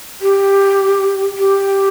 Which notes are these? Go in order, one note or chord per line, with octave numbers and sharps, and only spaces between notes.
G4
G4